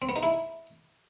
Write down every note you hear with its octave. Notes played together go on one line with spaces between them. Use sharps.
C4
B3
D#4
E4